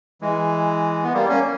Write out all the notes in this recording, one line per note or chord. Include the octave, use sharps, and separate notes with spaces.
E3 G#3
B3
G3 A#3
A#3 C#4